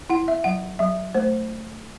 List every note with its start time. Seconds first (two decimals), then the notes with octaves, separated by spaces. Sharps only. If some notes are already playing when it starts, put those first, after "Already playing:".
0.10 E4 F#5
0.28 E5
0.44 F#3 F#5
0.79 F#3 E5
1.15 A3 C5